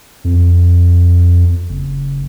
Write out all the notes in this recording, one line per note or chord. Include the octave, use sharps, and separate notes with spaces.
F2
F#1